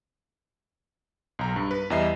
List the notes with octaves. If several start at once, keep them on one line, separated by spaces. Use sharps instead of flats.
B1 A#5
G2
B4
E2 G3 D#5 E5 C7